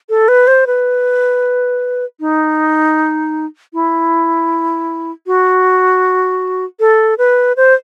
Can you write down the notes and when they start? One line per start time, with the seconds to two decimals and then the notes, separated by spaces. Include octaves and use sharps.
0.09 A4
0.28 B4
0.47 C5
0.67 B4
2.20 D#4
3.73 E4
5.27 F#4
6.80 A4
7.18 B4
7.57 C5